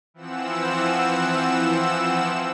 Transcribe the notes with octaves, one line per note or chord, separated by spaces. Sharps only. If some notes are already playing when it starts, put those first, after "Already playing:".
E3 F3 C4 F#5 E6 E7